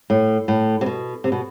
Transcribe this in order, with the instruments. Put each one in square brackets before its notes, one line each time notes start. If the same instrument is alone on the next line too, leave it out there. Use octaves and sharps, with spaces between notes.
[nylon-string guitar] A2
A2
C3
B2
C3
B2